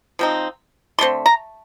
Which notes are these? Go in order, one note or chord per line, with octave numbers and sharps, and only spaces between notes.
F3 C4 D#4
D3 A3 C4 C6
A#5